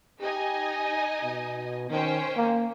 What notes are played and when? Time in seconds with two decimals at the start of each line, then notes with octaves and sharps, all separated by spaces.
0.21 D#4 G4 D#5 G#5
1.24 B2
1.90 D#3 C#4 C5 G5
2.37 A#3